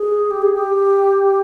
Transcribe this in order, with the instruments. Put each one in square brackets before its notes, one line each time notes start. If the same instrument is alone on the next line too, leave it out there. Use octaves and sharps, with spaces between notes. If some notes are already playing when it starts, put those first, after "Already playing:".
Already playing: [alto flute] G#4
G4
G#4
G4